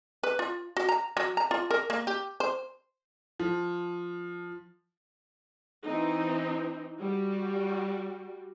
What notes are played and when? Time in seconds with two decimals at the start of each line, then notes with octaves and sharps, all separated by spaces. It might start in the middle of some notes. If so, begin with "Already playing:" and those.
0.23 B4
0.39 F4
0.77 F#4
0.89 A#5
1.17 F#3
1.37 A#5
1.51 F4
1.71 A#4
1.90 A#3
2.07 G4
2.40 C5
3.40 F3
5.85 E3 C4 D#4
6.99 G3 F#4